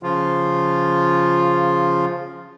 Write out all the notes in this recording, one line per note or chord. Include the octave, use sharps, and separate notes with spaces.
C#3 F3 F4